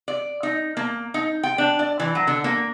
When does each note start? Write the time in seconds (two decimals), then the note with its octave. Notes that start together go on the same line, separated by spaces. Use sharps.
0.08 D5
0.43 D#4
0.77 A#3
1.14 D#4
1.43 G5
1.58 D4
1.79 D5
2.00 E3
2.15 F#3
2.27 D3
2.44 A#3